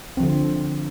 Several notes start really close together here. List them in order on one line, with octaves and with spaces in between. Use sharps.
C4 F3 D3